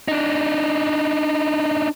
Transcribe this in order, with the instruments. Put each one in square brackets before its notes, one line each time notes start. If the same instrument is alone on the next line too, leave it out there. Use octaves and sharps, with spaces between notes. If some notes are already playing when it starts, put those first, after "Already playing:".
[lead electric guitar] D4 D#4